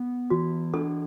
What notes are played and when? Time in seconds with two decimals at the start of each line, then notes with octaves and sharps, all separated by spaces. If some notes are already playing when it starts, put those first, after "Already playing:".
Already playing: B3
0.30 E3 F#4
0.74 D4 A4